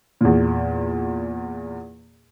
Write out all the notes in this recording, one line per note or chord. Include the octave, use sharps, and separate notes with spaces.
E2 A#2